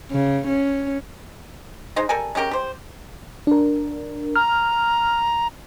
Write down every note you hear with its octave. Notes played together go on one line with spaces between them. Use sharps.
C#3
C#4
G#3 D#4 C5 D#5
G3 A4 A#4 G#5
G#3 C#4 G4 A#4
G4 C5
D4 A#4
A#5 F6